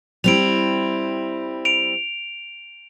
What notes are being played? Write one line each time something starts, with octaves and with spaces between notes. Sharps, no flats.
G3 C4 E4 D7 F7
D7 F7